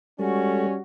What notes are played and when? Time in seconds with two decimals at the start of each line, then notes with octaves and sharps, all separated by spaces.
0.19 G3 G#3 C#4 F#4 A4